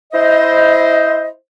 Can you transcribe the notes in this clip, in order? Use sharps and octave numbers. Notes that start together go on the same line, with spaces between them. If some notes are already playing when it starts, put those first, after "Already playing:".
E4 C5 D#5